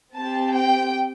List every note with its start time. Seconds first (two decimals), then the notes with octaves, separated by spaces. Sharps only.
0.15 C4 G4 A5
0.52 G5